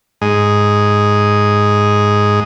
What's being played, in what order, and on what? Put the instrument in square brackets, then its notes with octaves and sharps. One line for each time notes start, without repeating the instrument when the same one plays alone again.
[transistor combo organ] G#2 G#4